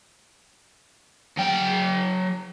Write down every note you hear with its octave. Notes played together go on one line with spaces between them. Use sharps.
F#3 G5